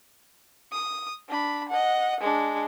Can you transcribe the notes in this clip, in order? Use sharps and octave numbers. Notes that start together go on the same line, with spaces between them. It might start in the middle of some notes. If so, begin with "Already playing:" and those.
D#6
D4 B5
D#5 F#5
G#3 D4